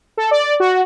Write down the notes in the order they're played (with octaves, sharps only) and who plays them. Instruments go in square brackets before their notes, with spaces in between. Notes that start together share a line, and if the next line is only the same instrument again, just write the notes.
[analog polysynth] A4
D5
F#4